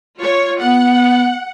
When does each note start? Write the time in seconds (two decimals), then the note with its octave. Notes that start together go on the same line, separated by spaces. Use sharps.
0.19 F4 C#5
0.61 B3 F#5